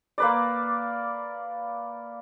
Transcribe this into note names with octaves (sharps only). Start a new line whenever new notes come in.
A#3 B4 D5